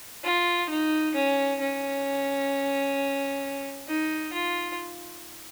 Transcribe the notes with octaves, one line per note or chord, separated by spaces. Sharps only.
F4
D#4
C#4
C#4
D#4
F4